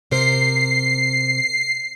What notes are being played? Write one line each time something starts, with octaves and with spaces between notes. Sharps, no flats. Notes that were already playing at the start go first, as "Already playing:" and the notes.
C3 A#4 C5 C7